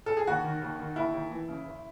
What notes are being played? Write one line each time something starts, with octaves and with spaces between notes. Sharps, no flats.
A4
G#4
D#2 F#4
D#3
D#2
D#3
D#2 E4
D#2
E3
C#3
F#1